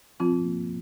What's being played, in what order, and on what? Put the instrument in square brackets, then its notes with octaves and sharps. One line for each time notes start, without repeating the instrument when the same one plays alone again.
[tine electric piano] F3 [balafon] C4 F4
[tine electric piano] A#3